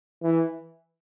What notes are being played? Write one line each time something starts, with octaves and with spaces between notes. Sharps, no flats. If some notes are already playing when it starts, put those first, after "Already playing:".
E3